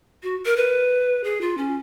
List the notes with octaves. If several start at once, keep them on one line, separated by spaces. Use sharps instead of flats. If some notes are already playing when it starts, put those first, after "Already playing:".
F#4
A#4
B4
G#4
F4
C#4